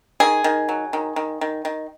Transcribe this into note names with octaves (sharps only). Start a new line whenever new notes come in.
D#3 G#4
D#3
F#3
D#3
D#3
D#3
D#3